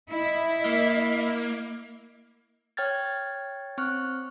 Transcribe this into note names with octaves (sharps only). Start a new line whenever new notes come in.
E4 D#5
A#3
C#5 G5 F6 G#6 A6
C4 C#6 F6 F#6